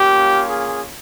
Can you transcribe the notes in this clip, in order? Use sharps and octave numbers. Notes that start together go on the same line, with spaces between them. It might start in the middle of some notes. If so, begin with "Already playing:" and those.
Already playing: A#3 C#4 F4 G4
G#4